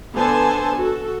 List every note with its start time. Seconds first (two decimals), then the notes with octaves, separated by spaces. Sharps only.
0.15 D3 B3 A4 C5 G#5 A5
0.76 F#4 A4